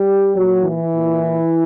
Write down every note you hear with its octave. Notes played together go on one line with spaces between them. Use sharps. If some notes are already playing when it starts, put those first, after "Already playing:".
Already playing: G3 G4
A#2 F#3 F#4
E3 E4
A#2